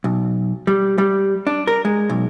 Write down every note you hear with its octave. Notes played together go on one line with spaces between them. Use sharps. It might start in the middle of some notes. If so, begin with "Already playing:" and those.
B1
G3
G3
D4
A#4
G#3
B1